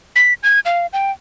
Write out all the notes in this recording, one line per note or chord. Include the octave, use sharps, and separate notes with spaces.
B6
G#6
F5
G5